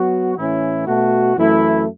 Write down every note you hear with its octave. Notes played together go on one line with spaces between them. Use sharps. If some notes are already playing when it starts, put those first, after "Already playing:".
Already playing: F#3 B3 F#4
A2 E3 C#4 E4
B2 A3 F#4
F#2 E3 A3 E4